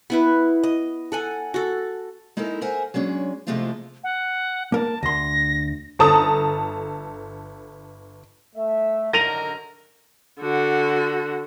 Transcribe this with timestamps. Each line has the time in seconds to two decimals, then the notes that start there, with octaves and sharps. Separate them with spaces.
0.10 B3 E4 B4
0.63 D#5
1.12 A4 F#5 G#5
1.54 F#4 A4
2.37 G#3 D#4 E4 A4 A#4
2.61 A#4 C5 E5 F#5 G#5
2.94 F#3 G#3 C#4 D4
3.47 C3 F3 G#3 A3 E4 F4
4.04 F#5
4.72 A#3 A#4 A5
5.03 D2 C6 A#6
5.99 G1 A4 A5 A#5 D#6
8.56 A3 E5
9.13 F#2 D3 D#3 A#4 A#6 D#7 F7
10.40 D3 F#4